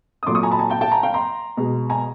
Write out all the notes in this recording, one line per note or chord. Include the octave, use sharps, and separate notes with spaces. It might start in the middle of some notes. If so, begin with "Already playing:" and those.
D#6
A#2 F#3 A3 C6 D6
C#6 D#6
G#5 A#5
A5 B5
G#5 A#5
G5 A5
G5 A5
G#5 A#5
F5 G5
A#5 C6
B2 G#3
G#5 A#5